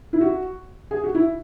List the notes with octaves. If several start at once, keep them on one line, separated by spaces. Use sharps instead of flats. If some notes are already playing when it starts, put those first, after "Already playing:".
E4
F#4
G#4
F#4
E4